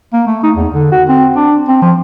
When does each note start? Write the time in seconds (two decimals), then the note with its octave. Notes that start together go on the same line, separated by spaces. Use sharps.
0.13 A#3
0.27 A3
0.43 D#4
0.56 E2
0.74 D3
0.91 F#4
1.09 C4
1.36 D4
1.68 C4
1.82 F3